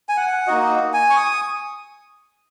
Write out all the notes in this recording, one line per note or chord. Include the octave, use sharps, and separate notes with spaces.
G#5
F#5
A#3 D#4 F#4 D#5
G#5
C#6
D#6